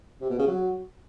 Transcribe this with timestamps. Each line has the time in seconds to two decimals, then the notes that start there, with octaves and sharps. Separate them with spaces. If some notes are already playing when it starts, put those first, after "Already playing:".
0.21 C3
0.30 B2
0.39 C#3
0.47 F#3